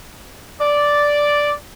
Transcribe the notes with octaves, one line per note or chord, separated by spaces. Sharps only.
D5